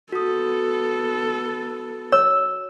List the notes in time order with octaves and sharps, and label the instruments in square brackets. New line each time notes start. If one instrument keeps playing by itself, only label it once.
[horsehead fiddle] B3 A4 [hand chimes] F#4 D#6
[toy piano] C#5 [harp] E6